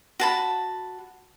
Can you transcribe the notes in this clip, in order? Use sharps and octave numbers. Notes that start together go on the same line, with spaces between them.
F#4 A5 B5